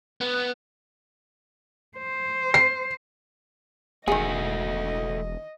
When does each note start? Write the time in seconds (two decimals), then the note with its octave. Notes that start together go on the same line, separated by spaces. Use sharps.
0.21 B3
1.98 C5
2.54 C7
4.08 E1 D#3 A3 F#4 G#4 D#5